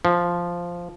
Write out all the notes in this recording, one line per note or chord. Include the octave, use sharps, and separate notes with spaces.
F3